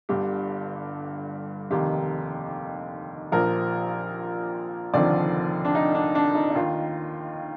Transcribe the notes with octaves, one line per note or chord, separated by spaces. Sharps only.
G1 G2 D3 G4
F1 D#2 D#3 G4
A#1 A#2 F3 A#4
F1 D#2 D3 F3 D5
D4
D#4
D4
D4
D#4
D#4
D#2 D#3 F4